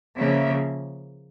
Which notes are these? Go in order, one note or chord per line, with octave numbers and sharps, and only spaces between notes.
C#3 F3 A#3 E5